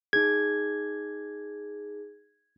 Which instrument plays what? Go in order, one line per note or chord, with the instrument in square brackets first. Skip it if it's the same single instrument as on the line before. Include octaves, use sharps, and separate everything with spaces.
[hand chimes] D#4 G#4 [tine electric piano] G#6